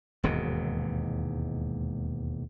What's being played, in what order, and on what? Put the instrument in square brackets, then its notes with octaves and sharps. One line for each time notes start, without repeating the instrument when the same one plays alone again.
[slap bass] E1 D#2 G#2 C3